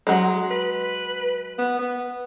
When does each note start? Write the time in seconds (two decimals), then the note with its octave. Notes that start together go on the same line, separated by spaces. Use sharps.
0.07 F#3 G#3
0.51 B4
1.58 B3
1.79 B3